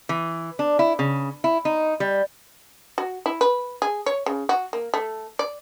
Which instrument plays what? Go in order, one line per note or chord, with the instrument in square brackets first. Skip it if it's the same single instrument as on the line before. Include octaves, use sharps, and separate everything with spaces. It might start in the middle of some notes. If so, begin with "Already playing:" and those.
[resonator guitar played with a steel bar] E3
D4
E4
C#3
E4
D#4
G3
[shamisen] F#4
E4
B4
G#4
C#5
C#3
F#4
A#3
A3
D5